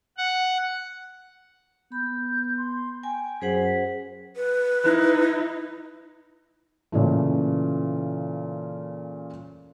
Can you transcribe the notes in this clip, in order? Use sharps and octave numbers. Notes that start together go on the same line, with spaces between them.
F#5
B3 B5 G6
C6
G5 G#5
F#2 G#4 C5 F#5 B6
B4
D#4 E4
A#2 C#3 E3 A3